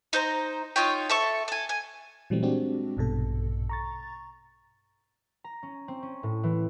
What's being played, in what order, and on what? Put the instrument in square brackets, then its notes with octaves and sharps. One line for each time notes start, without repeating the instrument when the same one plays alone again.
[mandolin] D#4 C5 A#5
D#4 F4 C#5 G5
A4 E5 C#6
A4 G#5
G#5
[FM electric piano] A#2 E3 F#3 G3 A3 C4
G#3 C4 D4 F#4 G4
A#1 G2 B2 A4
A#5 C#6 A6
[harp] A#5
C#4
C4
C#4
A2
E3